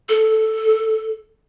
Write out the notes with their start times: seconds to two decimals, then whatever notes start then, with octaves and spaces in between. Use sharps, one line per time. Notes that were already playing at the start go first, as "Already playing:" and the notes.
0.09 A4